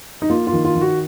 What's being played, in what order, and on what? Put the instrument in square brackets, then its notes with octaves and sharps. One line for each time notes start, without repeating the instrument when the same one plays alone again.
[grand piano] D#4
A#3 F4
F4
D#3
F4
D#3
F#4